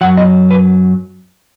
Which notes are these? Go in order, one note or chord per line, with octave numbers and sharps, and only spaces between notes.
F#2 F#3 F#5
D#5
B4